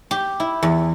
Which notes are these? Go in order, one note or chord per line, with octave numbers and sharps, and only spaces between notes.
G4
E4
E2